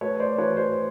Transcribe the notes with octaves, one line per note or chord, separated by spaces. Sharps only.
A3 B4 C#5
C5 D5
E3 B4 C#5
C5